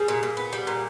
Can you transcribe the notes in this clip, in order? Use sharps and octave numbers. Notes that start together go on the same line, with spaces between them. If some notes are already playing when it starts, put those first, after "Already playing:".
Already playing: G3 G#4
A#2
A#2
B3
G3
A#2